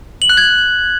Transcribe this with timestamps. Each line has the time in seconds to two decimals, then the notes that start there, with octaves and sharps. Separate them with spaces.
0.22 F#7
0.30 F#6
0.37 G#6